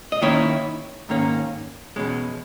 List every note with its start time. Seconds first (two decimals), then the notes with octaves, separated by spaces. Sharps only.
0.12 D#5
0.22 D#3 A#3 C#4 E4 C#5
1.09 G#2 D#3 A#3 C#4
1.96 E2 B2 G#3 C#4